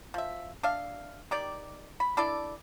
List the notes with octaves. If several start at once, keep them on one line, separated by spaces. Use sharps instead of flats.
F3 E5
D4 E5 F5
D#3 G4 D5
B5
D4 E4 A4 D5